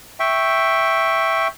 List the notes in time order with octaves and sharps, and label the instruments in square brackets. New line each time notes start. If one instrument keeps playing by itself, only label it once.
[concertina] E5 G5 C#6